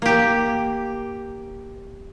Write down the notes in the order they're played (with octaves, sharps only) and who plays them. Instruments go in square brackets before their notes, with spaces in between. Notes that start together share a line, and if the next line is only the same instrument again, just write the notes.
[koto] A#3 G4